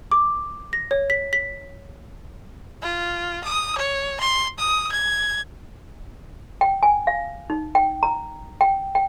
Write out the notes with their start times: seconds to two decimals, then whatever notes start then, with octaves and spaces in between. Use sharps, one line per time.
0.11 D6
0.73 A#6
0.91 C#5
1.10 B6
1.33 B6
2.82 F4
3.44 D#6
3.78 C#5
4.20 C6
4.59 D#6
4.92 G#6
6.61 G5
6.83 G#5
7.07 F5
7.50 D#4
7.75 G5
8.03 A#5
8.61 G5
8.95 G5